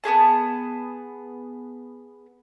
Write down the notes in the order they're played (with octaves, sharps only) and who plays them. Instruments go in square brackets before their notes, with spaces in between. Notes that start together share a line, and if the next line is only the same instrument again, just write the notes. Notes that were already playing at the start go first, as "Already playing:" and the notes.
[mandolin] B3 G4 G#4 A5